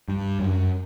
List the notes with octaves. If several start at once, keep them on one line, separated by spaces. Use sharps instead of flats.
G2
F#2